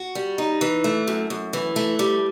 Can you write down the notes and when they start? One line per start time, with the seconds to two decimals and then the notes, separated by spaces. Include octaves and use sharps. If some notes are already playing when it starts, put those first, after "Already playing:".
Already playing: F#4
0.15 G3
0.38 D#4
0.61 E3
0.84 A3
1.08 F#2
1.30 F#2
1.53 E3
1.76 A3
1.99 G3